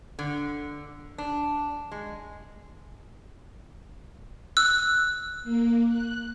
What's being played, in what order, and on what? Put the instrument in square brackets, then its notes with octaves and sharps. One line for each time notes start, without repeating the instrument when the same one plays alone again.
[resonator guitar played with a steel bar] D3
D4
G#3
[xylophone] E6 [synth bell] F#6
[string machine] A#3
F#6